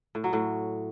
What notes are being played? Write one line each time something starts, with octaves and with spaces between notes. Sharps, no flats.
A2
F#3
A2